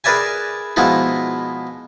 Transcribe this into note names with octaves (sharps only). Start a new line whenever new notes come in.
G#4 A#4 B4 D5 E5 G#5
B2 F3 G#3 B3 D#4 E4